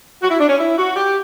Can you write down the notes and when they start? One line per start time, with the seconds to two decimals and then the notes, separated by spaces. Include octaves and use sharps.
0.21 F#4
0.29 E4
0.39 D4
0.48 C#4
0.58 E4
0.76 F#4
0.95 G4